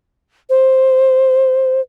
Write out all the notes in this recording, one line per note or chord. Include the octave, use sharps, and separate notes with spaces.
C5